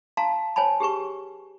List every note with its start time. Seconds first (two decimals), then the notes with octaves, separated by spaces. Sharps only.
0.17 F5 A5 A#5 C6
0.56 C5 C#5 G#5 A5 B5
0.80 G4 G#4 B4 C#6